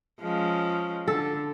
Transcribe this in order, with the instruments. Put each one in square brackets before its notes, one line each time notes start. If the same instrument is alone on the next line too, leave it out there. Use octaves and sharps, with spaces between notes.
[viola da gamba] F3 G#3 C#4
[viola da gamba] D3 [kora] A4